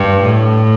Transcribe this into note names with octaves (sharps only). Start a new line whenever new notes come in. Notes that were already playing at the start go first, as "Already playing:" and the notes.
Already playing: G2
A2